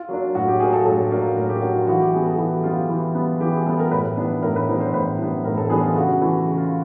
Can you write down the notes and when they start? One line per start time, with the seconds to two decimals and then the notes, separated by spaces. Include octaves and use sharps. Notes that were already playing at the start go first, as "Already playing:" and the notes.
Already playing: F4
0.09 F#3 A#3 D4
0.35 A2 F#4
0.48 G4
0.60 F#3 A#3 D4 G#4
0.73 A4
0.85 A2 A4
1.11 F#3 A#3 D4
1.36 A2 A#4
1.49 G4
1.62 F#3 A#3 D4 F#4
1.75 F4
1.87 E3 F#4
2.00 G4
2.13 G3 B3 G#4
2.26 A4
2.38 E3 F#4
2.64 G3 B3 F4
2.89 E3
3.15 G3 B3
3.41 E3 G4
3.54 G#4
3.66 G3 B3 A4
3.79 A#4
3.91 A2 B4
4.17 E3 G3 B3 D4
4.42 A2 A#4
4.56 B4
4.68 E3 G3 B3 D4 C5
4.80 C5
4.94 A2 B4
5.19 E3 G3 B3 D4
5.44 A2 A#4
5.57 A4
5.70 E3 G3 B3 D4 G#4
5.84 F4
5.95 C#3 F#4
6.21 E3 A3
6.47 C#3
6.58 F4